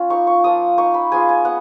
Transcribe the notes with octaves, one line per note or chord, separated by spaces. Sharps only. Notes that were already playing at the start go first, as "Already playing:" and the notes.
Already playing: C#4 F4
A#3 D#4 C#6
C#6
F3 A#3 F4 D#6
A#3 D#4 C#6
B5
G#3 B3 F4 G#5
G#5
B3 F#5